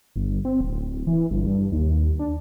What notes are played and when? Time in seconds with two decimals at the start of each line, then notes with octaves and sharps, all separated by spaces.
0.16 G1
0.45 C4
0.61 D1
1.07 E3
1.31 G1
1.46 G2
1.72 D#2
2.19 D4